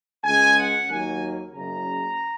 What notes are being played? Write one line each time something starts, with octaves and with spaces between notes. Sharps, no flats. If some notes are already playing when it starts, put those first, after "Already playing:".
C#2 C#3 G#3 G#5
F#5
D#2 D#3 F#3 A#3 G#5
F#1 F#2 C#3 A#5